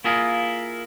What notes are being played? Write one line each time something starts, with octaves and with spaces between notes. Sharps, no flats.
A#3 E4 F4 G#4 A#4